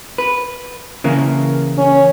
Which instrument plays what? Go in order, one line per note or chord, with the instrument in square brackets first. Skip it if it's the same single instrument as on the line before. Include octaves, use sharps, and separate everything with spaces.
[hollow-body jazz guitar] B4
C#3 E3 A#3
[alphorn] C#4